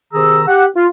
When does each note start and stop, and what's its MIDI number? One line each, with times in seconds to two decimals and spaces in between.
0.13 0.43 48
0.13 0.43 51
0.13 0.43 68
0.13 0.43 82
0.13 0.43 88
0.47 0.66 67
0.47 0.66 78
0.76 0.87 65